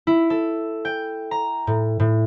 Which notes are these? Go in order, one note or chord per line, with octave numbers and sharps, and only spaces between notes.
E4
A4
G5
A#5
A2
A2